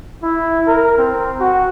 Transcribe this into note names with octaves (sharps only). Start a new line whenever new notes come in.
E4
A#4
C4
F#4